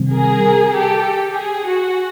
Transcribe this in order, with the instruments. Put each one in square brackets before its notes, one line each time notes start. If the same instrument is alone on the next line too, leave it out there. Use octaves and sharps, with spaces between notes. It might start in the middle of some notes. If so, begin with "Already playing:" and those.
Already playing: [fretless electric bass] C3 D#3 G3 C4
[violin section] G#4 A#4
G4 A4
G4
G#4
F#4